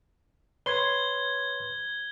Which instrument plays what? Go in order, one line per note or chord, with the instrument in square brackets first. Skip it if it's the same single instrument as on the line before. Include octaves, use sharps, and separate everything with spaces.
[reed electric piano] B4 C#5 C6 [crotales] G#6 G7